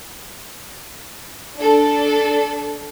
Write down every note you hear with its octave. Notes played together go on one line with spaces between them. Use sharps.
D4 A4